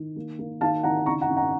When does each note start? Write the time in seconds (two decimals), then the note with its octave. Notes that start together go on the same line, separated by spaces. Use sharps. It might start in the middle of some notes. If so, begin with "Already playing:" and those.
Already playing: D#3
0.16 A#3
0.39 A#3
0.61 D#3 F5 A5
0.83 D#3 F#5 A#5
1.06 C#3 A#5 C#6
1.21 F#5 A#5
1.29 C#3
1.37 F#5 A#5